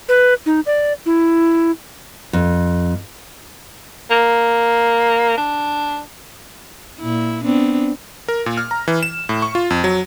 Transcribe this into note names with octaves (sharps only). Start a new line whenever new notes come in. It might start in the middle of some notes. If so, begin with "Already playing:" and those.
B4
D#4
D5
E4
F2
A#3
D4
A#2 E4
B3 C4 D4
A#4
A#2
F6
A#5
E3
E7
A2
C#6
F4
F2
F#3